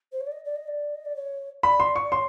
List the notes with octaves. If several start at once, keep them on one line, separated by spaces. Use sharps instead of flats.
C5
C#5
D5
D#5
D5
D#5
D5
D#5
D5
C#5
D5 B5
C6
C#6
D5
C#5 C6